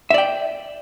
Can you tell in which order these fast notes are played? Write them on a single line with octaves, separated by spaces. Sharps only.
E5 D5 G5